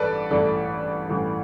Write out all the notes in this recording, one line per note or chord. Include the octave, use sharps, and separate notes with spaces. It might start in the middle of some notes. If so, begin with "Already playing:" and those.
Already playing: A1 G2 A4 B4 D5
A1 G2 E3 A3 A4 D5
A1 G2 E3 A3